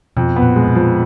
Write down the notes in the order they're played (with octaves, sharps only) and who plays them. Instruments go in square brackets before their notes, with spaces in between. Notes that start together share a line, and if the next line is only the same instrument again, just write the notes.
[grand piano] F2 [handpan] B2
[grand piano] B3
[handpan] A#2
[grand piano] G#3
[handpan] B2
[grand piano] F3